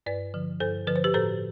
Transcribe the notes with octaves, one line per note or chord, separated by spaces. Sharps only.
G2 B4 D5
D3 F3
G2 A4 C5
D3 F3 B4
C5
G4 B4
A2 A4 C5